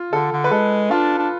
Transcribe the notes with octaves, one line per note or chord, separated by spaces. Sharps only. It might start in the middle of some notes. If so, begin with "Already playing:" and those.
Already playing: F4
D3 A4
D3
B4
G#3 A4
D4 F4
D4